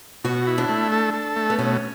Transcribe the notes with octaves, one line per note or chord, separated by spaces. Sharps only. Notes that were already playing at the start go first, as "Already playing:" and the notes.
B2 F#4
E4
D4
A3
A4
A4
A3
B3
B2 C#4